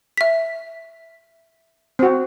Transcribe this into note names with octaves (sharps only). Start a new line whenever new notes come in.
E5 B6
C4 F#4